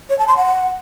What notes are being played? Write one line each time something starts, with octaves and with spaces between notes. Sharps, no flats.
C#5
A5
C6
F#5